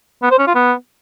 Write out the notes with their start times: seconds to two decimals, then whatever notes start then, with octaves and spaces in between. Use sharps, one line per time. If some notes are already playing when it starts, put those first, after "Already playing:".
0.22 B3
0.31 C5
0.39 C#4
0.47 F4
0.55 B3